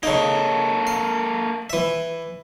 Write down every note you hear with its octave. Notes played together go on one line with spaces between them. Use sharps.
C#3 A#3 D#4 A4
F5
E3 E5